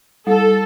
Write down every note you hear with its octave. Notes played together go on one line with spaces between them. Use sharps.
G3 A4